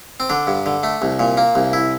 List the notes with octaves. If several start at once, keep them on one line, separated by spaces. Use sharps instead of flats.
C4
D3 D4
G2
D3
A3
C2
A#2
A#3
C2
E4